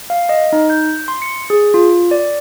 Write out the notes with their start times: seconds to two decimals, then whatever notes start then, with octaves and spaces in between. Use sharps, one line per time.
0.10 F5
0.29 D#5
0.53 D#4
0.70 G6
1.08 C6
1.22 C#7
1.50 G#4
1.74 F4
2.11 D5